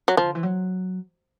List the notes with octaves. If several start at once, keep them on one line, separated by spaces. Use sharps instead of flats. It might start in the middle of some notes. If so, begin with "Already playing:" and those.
F#3
D#3 F3
D3
E3
F#3